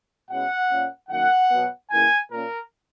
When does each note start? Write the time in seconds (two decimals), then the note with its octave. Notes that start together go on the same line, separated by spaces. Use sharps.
0.30 B2 G#3 C#4 E4 F#5
0.69 A#2 A#3 C#4
1.09 F#2 D#3 A#3 F#5
1.50 B2 F#3 B3
1.90 C#3 E3 A#3 E4 G#5
2.29 A#2 A#3 C#4 A#4